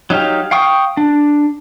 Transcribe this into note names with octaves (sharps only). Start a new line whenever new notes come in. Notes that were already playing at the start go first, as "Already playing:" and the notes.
F#3 D#4 G4 F5
F5 G5 C#6 D#6
D4